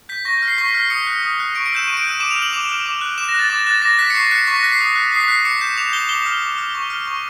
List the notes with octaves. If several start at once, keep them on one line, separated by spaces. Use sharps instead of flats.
G6 B6
C#6 A#6
A#6
F6
C7
C#6 B6
B6
F6
C7
D#6 C#7
F#6
D#6
F#6
C#6 D7
D7
E6 G6 E7
C#6 D#7
D7
E6 G6 D#7
D6 E7
F7
F6
F#7
D6 F7
F6
D6
F#6
D6 E7
A#6
F#6 A6
D6 A6
F#6 A6
D6 A#6
A#6
F#6 B6
C#7
C#6 C7
F#6 C#7
C#6 B6
A#6
F#6 B6
C7
D#6
F#6
D#6 C7
B6
F#6 C7
D6 C#7
G6 E7
D6 F7
G6 G7
D6 G7
F6
D6
F6
C#6
F6
C#6